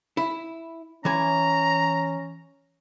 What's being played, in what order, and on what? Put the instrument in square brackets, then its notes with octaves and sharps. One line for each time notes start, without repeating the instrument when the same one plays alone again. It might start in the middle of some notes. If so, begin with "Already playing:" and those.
[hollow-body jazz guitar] E4
[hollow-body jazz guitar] E3 G#5 [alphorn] C#4 [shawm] A#5